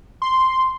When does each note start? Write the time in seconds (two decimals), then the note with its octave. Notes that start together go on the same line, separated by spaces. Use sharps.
0.22 C6